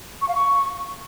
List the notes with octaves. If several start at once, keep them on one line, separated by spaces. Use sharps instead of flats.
C#6
F5
C#6